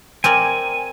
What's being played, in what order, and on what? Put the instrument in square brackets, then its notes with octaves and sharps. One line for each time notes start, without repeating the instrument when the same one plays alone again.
[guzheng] C4 A#4 D5 [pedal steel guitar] G#5